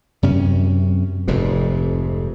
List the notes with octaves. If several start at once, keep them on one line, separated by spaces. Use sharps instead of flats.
F#2 C3 C#4
F1 F2 G#2 C3